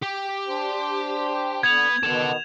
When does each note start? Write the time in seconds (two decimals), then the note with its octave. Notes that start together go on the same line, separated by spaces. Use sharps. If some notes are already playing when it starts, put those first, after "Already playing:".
0.03 G4
0.48 D4 C5
1.63 D3 B3 G#6 F7
2.03 B2 D#3 B3 A4 F#5 E7